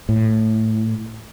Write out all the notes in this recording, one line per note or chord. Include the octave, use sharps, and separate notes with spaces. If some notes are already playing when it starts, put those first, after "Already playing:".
A2